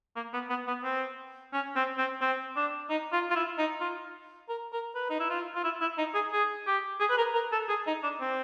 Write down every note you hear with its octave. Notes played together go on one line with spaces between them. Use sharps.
A#3
B3
B3
B3
C4
C#4
C4
C4
C4
D4
D#4
F4
F4
E4
D#4
F4
A#4
A#4
B4
D#4
E4
F4
F4
E4
E4
D#4
G#4
G#4
G4
G#4
B4
A#4
A#4
A4
G#4
D#4
D4
C4